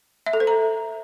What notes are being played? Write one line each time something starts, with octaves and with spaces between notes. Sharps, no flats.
E5
A4
C5
A#5